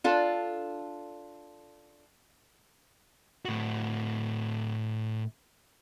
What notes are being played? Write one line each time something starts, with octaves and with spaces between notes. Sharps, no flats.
D4 F4 A4
A2 F#4